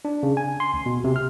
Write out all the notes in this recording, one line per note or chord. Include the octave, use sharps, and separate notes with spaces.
D4
C#3
G#5
C6
D2
B2
C3
F6